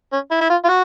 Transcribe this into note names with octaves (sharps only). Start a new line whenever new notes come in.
C#4
E4
E4
F4
F4
F#4